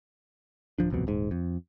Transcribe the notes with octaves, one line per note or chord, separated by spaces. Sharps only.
D1 F3 D4
D1 C2 F2 B2
D#1 G#2
F2